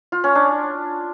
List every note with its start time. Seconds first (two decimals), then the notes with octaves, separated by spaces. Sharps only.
0.12 F4
0.24 C#4
0.35 D4